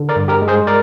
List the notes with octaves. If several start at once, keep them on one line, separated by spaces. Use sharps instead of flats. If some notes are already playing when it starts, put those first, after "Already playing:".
Already playing: D3
A#4 D5
G2
G4 A#4
G#3
G#4 C5
A#4 D5